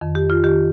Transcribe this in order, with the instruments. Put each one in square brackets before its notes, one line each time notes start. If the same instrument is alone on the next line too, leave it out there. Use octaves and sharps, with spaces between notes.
[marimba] F2 D#3
G4
F4
D#3 G4